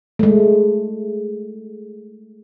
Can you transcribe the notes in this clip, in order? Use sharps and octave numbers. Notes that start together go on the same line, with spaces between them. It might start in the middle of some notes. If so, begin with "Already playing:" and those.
G#3 A3